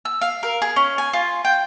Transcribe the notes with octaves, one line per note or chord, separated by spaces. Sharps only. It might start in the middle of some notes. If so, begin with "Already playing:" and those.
E6
F5
A#4
G#4
C#4
G#5
F4
G5